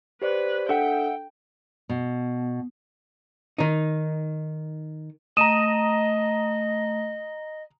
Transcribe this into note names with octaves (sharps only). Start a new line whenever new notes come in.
G4 B4 C5 D5
D4 A4 E5 F#5 G5
B2
D#3 D#4
A3 D#5 A#5 D#6 D#7 E7